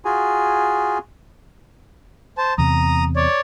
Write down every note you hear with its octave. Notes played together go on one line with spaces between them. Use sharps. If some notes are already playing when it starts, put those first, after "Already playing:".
F4 F#4 G#4 G#5
C5 A5
E2 C3 A#5 D#6
C#5 D5